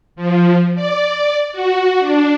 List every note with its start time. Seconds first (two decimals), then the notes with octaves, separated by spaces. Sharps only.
0.16 F3
0.75 D5
1.52 F#4
2.00 D4